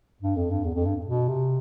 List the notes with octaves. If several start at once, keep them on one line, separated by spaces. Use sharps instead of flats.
G2
F2
G2
E2
F2
G2
B2
C3